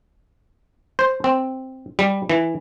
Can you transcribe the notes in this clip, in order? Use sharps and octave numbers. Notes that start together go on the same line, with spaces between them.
C5
C4
G3
E3